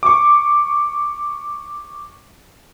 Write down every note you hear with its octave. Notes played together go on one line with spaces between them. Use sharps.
C#6 D6